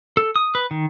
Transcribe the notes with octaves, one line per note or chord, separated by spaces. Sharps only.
A4
D#6
B4
D#3